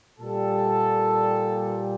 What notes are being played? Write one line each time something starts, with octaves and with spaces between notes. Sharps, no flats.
A#2 G3 A4